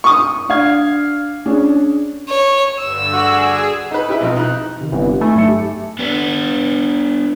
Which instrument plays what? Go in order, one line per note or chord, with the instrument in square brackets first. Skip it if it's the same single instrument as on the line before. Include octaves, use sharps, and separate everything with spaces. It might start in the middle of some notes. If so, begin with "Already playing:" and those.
[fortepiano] C#6 D#6
[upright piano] D4 F5 G#6
C#4 D4 G#4
[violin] C#5
[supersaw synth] G2 D3 [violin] E6
[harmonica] F#4 D5 [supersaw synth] G#4
[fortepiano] D#4 B4
D#4 E4 G4 G#4 B4 E5
B1 F3 C4 D#4
D#4 F#6
[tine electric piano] C3 D#3
[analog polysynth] G1 [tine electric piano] B3 C4 E4
[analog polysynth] A3 [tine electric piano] D#4 G#5 B5
[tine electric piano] G2 F#3 C#7
G4
[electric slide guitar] B3 D4 B4